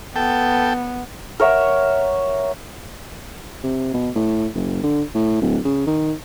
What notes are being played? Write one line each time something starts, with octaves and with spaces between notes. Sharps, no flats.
B3 A4 G5
A#4 C#5 E5 F#5
C3
B2
A2
F#1
D3
A2
D1
C#3
D#3